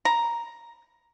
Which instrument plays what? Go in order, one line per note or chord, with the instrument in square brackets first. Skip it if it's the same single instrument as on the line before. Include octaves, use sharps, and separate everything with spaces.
[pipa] A#5